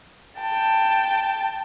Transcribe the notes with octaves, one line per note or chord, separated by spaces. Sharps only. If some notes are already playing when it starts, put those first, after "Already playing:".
G5 A5